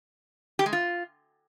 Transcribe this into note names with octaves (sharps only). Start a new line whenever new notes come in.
G4
G#3
F4